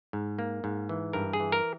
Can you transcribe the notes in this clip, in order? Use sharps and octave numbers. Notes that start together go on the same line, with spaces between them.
G#2
A#3
G#2
E3
G2 A#4
G#4
E3
A#4